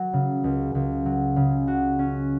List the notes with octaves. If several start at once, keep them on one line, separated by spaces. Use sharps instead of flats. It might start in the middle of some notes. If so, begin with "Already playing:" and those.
Already playing: F#3
C#3
C#2
C#2
F#3
C#3
F#4
C#4